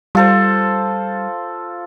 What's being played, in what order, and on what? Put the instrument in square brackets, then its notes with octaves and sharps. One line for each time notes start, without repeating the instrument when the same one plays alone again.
[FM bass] G3 [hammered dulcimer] F4 A4 C5